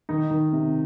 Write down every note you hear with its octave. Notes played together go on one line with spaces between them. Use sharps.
D#3 D#4
D#3
C3